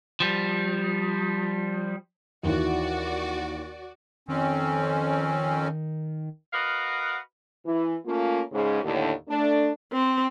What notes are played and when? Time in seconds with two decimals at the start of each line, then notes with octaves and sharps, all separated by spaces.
0.20 F3 G3
2.43 D#2 E3 F#4 D5
4.28 F2 D#3 C4 C#4
6.53 F#4 A#4 B4 D#5 F5 F#5
7.66 E3
8.06 A3 A#3 C#4 F4
8.52 G#2 C#3
8.83 D#2 A2 D3
9.29 A3 D4
9.93 C4